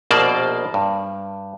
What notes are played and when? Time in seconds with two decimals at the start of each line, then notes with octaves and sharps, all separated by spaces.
0.11 A#1 B2 A#3 C5 D5 A5
0.74 G2